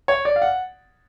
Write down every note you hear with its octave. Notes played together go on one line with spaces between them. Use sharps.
C#5
D5
F5
F#5